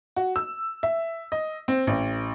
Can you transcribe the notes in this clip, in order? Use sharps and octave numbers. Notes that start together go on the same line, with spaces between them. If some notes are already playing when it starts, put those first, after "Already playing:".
F#4
E6
E5
D#5
C4
A1